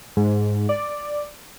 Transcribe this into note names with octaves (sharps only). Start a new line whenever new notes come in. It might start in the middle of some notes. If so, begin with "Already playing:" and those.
G#2
D5